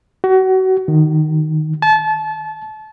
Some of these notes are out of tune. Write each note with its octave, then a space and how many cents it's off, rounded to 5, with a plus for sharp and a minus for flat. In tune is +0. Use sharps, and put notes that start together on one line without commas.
F#4 +30
D#3 -5
A5 -30